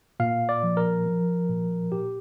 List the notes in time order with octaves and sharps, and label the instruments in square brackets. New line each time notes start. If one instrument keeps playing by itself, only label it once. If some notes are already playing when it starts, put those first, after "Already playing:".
[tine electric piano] A#2 F5
D5
F3
A#4
F3
A#2
A#2 G4